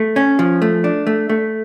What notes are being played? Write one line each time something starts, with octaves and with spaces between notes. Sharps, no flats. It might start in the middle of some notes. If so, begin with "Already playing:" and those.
Already playing: A3
C#4
F3
A3
D4
A3
A3